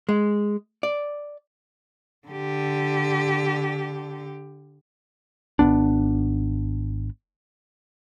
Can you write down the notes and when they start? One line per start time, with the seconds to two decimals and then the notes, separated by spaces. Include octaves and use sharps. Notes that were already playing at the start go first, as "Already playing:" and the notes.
0.09 G#3
0.83 D5
2.27 D3 G4
5.59 G#1 G2 B3 D4